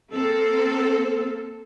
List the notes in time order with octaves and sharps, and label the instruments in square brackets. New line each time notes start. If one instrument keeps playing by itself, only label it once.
[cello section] A#3 C4 A4